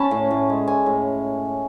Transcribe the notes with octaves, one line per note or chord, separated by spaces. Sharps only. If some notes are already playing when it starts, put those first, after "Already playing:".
Already playing: C#4 A5 B5
A2
A2
G#3
C#4 G#5
A2